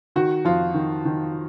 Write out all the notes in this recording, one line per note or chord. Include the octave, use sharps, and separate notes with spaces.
D#3 F#4
F2 F4
D#3
D#3